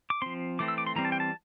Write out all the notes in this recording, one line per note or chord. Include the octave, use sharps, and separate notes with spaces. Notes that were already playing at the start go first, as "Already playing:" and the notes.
D6
F3 C4 C6
E3 A3 C4 D6
E6
D6
C6
E3 G3 C4 A#5
A5
G5
A5